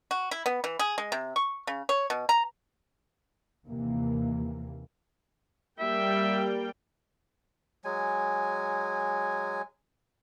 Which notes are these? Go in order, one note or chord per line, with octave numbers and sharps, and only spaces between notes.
F#4
E4
B3
E3
G#4
G#3
C3
C#6
C#3
C#5
B2
A#5
D#2 C3 E3 A#3
G3 A#3 E5 G5
F#3 G#3 G#5